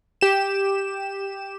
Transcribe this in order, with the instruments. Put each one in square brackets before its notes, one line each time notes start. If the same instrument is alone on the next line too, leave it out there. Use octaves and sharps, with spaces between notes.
[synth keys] G4 E7